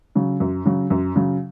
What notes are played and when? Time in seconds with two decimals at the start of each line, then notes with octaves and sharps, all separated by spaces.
0.15 C#3 F#3
0.40 F#2
0.65 C#3 F#3
0.90 F#2
1.16 C#3 F#3